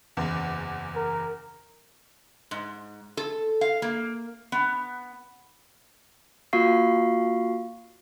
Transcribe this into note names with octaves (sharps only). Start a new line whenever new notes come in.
F#1 E2
A#4
G#2
A4
F5
A#3
B3
A#3 F4 F#4 F5 C#6 C7